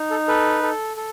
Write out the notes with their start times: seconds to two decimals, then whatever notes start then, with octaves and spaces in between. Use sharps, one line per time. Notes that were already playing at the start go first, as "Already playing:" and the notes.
Already playing: D#4
0.11 A4
0.28 A4 B4
0.63 A4
0.97 A4